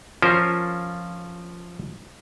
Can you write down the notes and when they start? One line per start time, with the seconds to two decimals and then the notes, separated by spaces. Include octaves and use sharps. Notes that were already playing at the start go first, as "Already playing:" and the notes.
0.22 F3 C#4 F4 A#4 C5